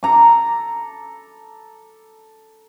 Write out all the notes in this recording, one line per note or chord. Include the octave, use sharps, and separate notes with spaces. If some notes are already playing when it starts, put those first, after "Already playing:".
A4 A#5 D6